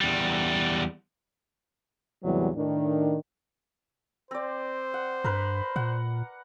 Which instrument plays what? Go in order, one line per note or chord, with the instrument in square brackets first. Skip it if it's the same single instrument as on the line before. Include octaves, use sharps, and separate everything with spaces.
[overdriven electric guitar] E2 G3
[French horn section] E2 A2 C3 E3 F#3 G3
A2 D#3 D4
[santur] C4 D5 [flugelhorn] C5
[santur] F#5
[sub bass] G2 [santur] A#4 B4
[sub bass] A#2 [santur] F#5